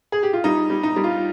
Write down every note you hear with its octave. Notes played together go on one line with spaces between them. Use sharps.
G#4
G4
F4
G3 D#4
G3
D#4
G3
F4